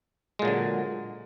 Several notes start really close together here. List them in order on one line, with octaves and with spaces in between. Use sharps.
G#3 A#2 F#3 D3